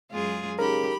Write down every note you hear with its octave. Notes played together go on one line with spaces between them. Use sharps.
F#2 G#3 F4 G#4
C#3 D#4 G4 A#4 B5